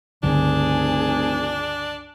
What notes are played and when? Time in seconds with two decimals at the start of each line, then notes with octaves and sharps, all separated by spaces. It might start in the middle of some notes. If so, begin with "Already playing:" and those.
0.23 F1 C#2 G2 D3 D4 G#4